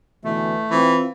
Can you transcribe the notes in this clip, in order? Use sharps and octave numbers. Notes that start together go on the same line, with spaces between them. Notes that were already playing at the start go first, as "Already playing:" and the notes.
B2 D3 E3 A3
E3 C4 F4